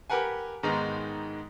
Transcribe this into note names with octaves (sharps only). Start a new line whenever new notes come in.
G4 A#4 B4 F#5 G#5
G#2 D#3 G#3 B3 D#4